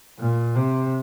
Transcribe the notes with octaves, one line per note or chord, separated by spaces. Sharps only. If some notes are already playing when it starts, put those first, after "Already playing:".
A#2
C3